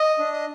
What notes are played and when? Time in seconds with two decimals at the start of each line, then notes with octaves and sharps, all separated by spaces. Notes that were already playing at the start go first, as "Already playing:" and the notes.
Already playing: D#5
0.19 D4
0.33 D#5